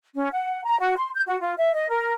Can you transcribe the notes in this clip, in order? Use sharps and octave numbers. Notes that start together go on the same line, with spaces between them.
C#4
F#5
A#5
F#4
C6
G6
F#4
F4
E5
D#5
A#4